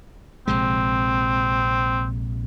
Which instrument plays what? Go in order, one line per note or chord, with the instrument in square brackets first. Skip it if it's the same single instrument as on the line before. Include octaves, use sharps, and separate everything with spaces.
[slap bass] A#1 C3 G#3 [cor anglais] C4